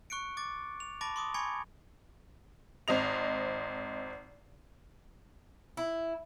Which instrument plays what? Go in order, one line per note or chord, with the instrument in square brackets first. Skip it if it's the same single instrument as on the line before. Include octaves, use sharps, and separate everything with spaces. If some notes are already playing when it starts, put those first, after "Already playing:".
[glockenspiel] C#6 F#6 C#7 D7
D6 A6
F7
A5 B5 D6 A6 A#6 D7
C6 D6 D#6
G#5 B5 C#6 G#6 C#7
[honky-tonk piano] G#1 C4 D#5 F7
[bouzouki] E4